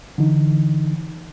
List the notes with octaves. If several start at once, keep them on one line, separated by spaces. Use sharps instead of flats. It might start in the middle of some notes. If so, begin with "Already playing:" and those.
D3 E3 D#4